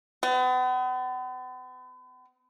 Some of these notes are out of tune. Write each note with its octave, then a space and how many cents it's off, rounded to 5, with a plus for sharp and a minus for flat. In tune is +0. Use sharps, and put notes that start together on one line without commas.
B3 +40